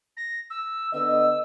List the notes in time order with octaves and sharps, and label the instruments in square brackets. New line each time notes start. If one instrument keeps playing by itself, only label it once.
[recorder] A#6
E6
[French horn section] D3 B3 D#5 [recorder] E6